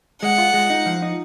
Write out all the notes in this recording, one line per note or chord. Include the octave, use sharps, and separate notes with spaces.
G#3 F#5
F4
G#3
D#4
F3
D#4